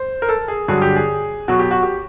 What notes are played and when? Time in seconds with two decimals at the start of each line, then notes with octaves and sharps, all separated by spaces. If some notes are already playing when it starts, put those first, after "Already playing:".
Already playing: C5
0.22 A#4
0.29 A4
0.48 G#4
0.68 G2 D3 F#3 G#4
0.82 G4
0.96 G#4
1.48 B2 F#3 F#4
1.59 G4
1.71 F#4
1.83 G4